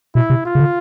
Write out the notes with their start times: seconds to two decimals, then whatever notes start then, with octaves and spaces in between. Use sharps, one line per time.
0.15 B2 E4
0.30 C3
0.45 F4
0.55 C#3
0.60 D3